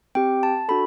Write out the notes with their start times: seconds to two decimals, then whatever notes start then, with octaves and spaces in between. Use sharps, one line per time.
0.15 C4 G4 G5
0.43 A5
0.69 D4 F#4 A4 B5